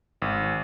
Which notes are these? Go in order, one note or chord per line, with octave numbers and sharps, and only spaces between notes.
G#1